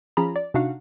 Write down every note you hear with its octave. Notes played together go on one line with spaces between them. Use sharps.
F3 C#4 F4 G#4 A#5 B5
D5
C3 D4 D#4 F#4 F5 F#5